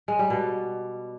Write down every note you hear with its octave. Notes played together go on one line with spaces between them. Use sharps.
G#3
G3
B2